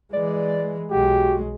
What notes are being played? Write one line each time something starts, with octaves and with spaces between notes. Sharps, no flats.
E3 G#3 D5
B1 G#3 F#4 G4